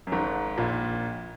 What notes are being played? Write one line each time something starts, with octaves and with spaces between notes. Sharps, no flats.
F#2
G#1 G#2
A#1 A#2